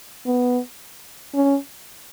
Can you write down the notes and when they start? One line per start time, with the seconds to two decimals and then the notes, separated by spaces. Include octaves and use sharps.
0.26 B3
1.35 C#4